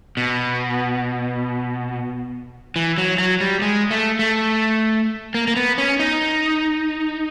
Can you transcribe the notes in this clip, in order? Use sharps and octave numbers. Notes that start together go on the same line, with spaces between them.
B2
E3
F#3
F#3
G3
G#3
A3
A3
A#3
A#3
B3
C#4
D#4